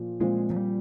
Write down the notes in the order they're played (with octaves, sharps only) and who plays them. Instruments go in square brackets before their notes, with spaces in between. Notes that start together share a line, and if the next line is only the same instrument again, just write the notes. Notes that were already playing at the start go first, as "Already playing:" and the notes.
Already playing: [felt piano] A#2 F3
[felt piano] A#2 F3 C4 [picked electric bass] G#3
[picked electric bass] F3
G3